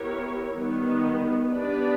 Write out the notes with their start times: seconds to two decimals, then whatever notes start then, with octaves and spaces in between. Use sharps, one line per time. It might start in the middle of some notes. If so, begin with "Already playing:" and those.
Already playing: B3 E4 G4 A#4 C#5
0.56 D#3 G3 B3
1.51 B3 D4 G4 B4 D5